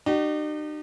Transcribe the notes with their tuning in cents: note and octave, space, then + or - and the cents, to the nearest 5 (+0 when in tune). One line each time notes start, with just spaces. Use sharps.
D#4 -45 G4 -45